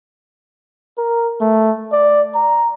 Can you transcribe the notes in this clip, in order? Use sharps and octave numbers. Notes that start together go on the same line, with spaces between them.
A#4
A3
D5
A#5